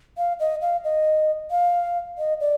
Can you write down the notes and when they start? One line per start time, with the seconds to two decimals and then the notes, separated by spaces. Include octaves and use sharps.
0.17 F5
0.40 D#5
0.61 F5
0.84 D#5
1.51 F5
2.18 D#5
2.40 D5